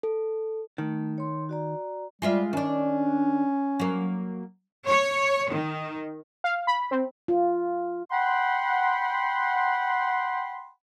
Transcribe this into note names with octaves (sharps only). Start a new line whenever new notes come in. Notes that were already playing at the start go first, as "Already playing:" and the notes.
A4
D#3 A3
C#5 C6
F#4 D5 A#5
G3 G#3 F4 E5
D#3 C#4 D4
F#3 A#3
C#5
D#3
F5
B5
C4
F4
F#5 G5 B5 C6